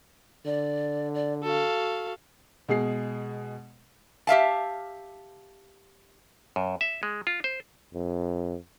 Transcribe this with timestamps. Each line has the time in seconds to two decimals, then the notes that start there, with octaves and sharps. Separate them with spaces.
0.45 D3 D5
1.14 D5
1.43 F#4 A4 F5
2.69 B2 G#3 G#4 C7
4.27 G4 E5 F5 A5
6.56 F#2
6.81 E5
7.03 G#3
7.27 F4
7.44 C5
7.94 F2